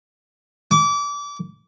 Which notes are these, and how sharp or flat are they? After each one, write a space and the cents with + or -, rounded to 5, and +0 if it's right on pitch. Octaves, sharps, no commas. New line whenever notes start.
D6 -30